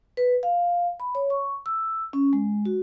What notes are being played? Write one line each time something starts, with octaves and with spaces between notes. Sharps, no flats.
B4
F5
B5
C#5
C#6
E6
C#4
G#3
F#4